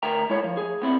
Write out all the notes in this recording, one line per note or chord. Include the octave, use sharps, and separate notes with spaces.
D2 A#4 E5 G5 A#5
G#3 E4 C#5
F3
G#4
B3 C4 E4